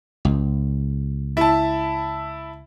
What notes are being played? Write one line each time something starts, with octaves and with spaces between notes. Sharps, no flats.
C#2
E4 A5